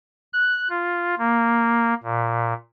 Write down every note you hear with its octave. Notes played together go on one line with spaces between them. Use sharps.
F#6
F4
A#3
A#2